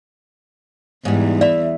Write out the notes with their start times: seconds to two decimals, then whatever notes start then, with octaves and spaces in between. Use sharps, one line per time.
1.05 E2 G#2 G3
1.41 D5 E5 B5